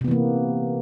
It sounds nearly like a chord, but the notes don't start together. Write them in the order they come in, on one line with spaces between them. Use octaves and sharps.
C3 B3 E3 A#3